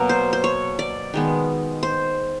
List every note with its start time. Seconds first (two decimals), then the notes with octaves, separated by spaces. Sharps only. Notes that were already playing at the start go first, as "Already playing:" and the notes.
Already playing: B2 F#3 A#3 A#4
0.09 C5
0.33 C5
0.44 C#5
0.79 D5
1.14 D#3 G#3 B3
1.83 C5